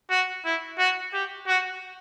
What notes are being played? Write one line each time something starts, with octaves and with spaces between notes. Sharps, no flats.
F#4
E4
F#4
G4
F#4